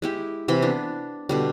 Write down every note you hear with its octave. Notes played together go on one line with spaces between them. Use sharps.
G#3 E4 G4
C3 E3 B5 C6
B3 D4
B2 D3 G3